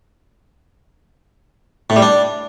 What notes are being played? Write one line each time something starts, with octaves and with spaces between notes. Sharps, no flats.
A2
G3
D4